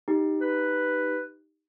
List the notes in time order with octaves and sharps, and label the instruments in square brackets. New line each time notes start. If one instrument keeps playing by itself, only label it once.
[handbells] D#4 G4
[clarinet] B4